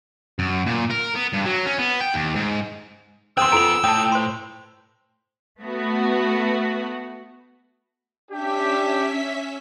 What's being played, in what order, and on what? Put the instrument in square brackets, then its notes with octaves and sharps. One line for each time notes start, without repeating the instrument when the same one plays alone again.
[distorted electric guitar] F#2
A#2
A#4
B3
G2
F#3
C#4
B3
G5
D#2
G#2
[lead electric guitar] B3 G#4 [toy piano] C5 D#6 [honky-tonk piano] G5 C6 [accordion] E6
[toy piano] F4 A4 A#5 [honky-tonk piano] D7 F7
[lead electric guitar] A2 [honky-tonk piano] G5 [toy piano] A5 D#6
[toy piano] C5 C6
[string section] A3 B3 F#4
[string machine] C#4 E5 B6 [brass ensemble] D4 G4